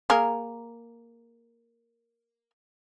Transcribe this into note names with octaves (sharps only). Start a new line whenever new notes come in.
A#3 G#4 A#4